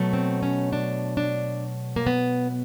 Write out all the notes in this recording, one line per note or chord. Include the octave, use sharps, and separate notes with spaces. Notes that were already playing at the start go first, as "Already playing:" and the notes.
Already playing: B2 F#3 A3
C4
C#4
D4
D4
A#3
B3